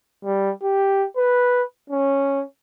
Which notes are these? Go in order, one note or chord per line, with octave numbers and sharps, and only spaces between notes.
G3
G4
B4
C#4